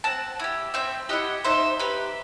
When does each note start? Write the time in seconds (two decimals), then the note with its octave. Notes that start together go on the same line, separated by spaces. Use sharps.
0.04 C4 F#5 A5
0.40 E4 G4
0.74 C4 E5 G5
1.09 E4 G4 D#5 F#5
1.44 D#4 C5 E5
1.79 G4 B4